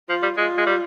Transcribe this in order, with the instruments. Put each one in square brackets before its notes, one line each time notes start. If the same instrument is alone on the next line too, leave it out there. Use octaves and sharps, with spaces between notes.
[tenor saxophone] F3 [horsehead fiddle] F4
[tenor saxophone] G3
[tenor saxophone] G#3 [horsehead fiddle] F4
[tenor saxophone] G#3
G3